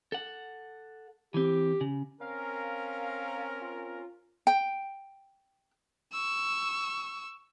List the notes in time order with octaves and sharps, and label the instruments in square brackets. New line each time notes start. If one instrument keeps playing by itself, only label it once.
[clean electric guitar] A4 F#5
[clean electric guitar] E3 C4 [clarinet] G4
[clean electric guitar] C#3
[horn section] C4 C#4 A#4 [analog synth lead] F5
[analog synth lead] F4
[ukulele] G5
[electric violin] C#6 E6